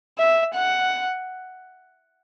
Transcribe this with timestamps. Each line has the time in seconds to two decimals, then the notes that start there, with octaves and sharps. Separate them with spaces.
0.18 E5
0.54 F#5